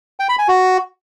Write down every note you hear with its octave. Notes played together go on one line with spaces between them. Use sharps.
G5
B5
G#5
F#4